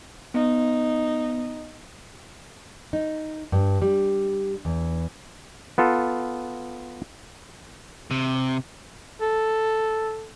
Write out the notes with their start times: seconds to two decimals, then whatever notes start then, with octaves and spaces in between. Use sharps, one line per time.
0.34 B3 D#4
2.93 D#4
3.52 G2
3.82 G3
4.65 E2
5.78 B3 F4 A4
8.11 C3
9.21 A4